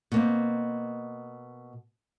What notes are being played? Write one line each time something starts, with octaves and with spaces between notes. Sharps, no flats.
B2 A#3 C4